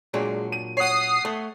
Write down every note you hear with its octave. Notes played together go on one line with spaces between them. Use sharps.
A#2 F#3 G#3 D4
D#7
C#5 F#5 D#6 C7
A3